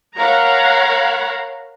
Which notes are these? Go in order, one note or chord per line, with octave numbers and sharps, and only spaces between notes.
A#4 C#5 F5 F#5 A#5 B5